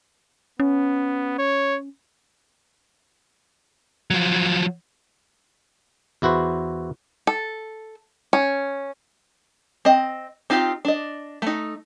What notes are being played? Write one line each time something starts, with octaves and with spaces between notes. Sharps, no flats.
B3 C#4
C#5
F3 F#3
E2 E4 F#4 B4 C5
A4
C#4
C4 D#5
C4 D#4 F4 G4
D4 D#5
A3 D#4